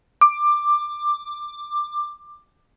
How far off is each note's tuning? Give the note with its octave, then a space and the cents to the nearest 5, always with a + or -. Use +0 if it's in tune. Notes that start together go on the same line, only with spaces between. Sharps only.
D6 +15